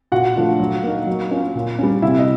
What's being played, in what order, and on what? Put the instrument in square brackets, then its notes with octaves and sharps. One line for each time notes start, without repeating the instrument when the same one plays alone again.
[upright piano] A#2 F#4 F#5
F3 A3 D4 F4
F#3
A#3 D#4
F#3
A#3 C#4 F4
A#2
G3 A#3 C#4
C3 E4 E5
D#5